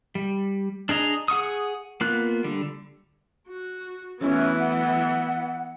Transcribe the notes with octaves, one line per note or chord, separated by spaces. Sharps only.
G3
D4 G#4 D#5 A#5
G#4 F#5 C#6 D#6
A#3 B3 F4 F#6
D3 G3
F#4
E3 F#3 A3 B3 C#4 E4
F#5